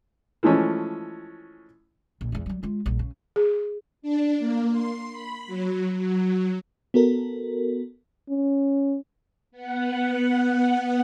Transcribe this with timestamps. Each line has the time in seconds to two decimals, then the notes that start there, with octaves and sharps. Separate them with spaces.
0.43 E3 F3 G#3 A3 C#4
2.21 A#1
2.32 E2 D3
2.46 F#3 G3
2.63 G#3 F4
2.86 A#1 G3
2.99 C#3
3.36 G#4
4.02 D4
4.39 A#3
4.72 C6
5.12 B5
5.47 F#3
5.98 F#3
6.94 B3 F#4 A4 A#4
8.29 C#4
9.51 B3 F#5